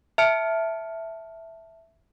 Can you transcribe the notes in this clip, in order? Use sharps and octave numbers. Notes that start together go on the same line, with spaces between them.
E5 A5 F6 C#7 D7